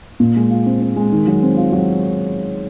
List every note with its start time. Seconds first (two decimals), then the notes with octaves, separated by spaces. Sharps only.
0.20 A#2
0.36 G#3
0.50 F4
0.66 C4
0.82 C4
0.96 G#3
1.12 D#3
1.27 F#3
1.43 C4
1.57 F4
1.73 F#3